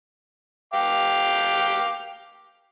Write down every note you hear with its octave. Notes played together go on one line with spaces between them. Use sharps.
F5 G5 D6